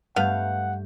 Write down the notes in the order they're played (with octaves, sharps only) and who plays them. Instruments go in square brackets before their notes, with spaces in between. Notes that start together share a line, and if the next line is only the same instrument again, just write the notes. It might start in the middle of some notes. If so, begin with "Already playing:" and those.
[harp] G2 A3 G6 [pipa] B3 F5 [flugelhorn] F#5